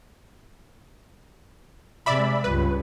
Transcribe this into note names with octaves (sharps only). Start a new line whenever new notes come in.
C3 G#3 D5 E5 B5
C#2 G2 B4